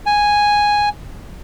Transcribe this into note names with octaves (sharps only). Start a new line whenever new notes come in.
G#5